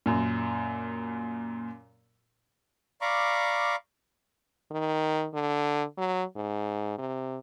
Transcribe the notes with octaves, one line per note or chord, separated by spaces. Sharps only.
F#2 A#2
D5 F5 A#5 B5 C#6 D6
D#3
D3
F#3
G#2
C3